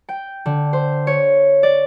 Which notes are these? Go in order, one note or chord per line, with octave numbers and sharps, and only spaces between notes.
G5
D3
C5
C#5
D5